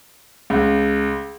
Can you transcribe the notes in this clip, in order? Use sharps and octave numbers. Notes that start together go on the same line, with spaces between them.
C#2